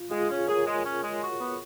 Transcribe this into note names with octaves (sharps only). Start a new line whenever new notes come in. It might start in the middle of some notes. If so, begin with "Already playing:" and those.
Already playing: F4
G#3 F4 G#4
C#4 F4
G#4 A#4 C#5
G#3
C#4
G#3
F#4
B3